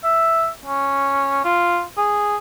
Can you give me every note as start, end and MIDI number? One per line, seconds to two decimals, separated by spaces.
0.04 0.49 76
0.65 1.40 61
1.44 1.82 65
1.98 2.37 68